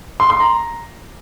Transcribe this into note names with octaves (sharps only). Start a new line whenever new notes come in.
C6
C6
A#5